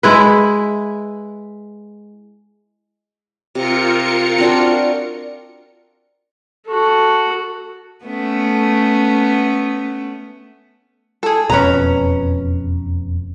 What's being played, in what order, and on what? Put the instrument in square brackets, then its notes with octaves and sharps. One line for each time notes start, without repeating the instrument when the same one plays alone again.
[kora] G#3 E4 B4
[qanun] C3 [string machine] F4 A#4 C#7
[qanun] C4 D4 F#4
[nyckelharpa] F#4 A4
[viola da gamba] A3 B3 C#4
[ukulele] G#4 A4
[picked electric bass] E1 F2 B2 [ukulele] C#4 B4 A#5